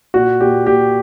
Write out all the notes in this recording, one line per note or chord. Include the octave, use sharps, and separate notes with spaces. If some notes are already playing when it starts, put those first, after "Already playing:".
A#2 F#4
A#2 G4
A#2 G4